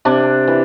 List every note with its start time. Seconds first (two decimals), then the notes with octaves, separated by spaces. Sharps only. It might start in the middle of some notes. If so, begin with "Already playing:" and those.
0.05 C3 D4
0.47 E3